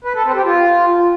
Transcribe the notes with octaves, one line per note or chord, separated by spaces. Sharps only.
B4
A4
C4
G4
F4